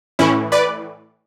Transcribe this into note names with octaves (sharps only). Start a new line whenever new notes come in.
A2 E3 C#4 E4
B4 D5